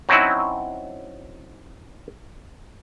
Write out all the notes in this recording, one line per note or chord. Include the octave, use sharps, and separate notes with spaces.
F#3 C4 C#4 D#4 E4 F#4